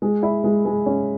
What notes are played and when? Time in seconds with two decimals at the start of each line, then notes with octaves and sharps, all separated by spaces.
0.02 G#3
0.23 E4
0.44 G#3
0.65 G#3
0.86 C#4